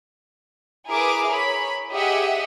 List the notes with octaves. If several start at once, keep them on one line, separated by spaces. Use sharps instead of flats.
E4 G#4 A#4 B4 E5 D6
C#5 B5
G4 G#4 D#5 E5 F#5